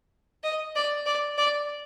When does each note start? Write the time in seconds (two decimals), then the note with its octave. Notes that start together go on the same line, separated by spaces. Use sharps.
0.44 D#5
0.75 D5
1.06 D5
1.38 D5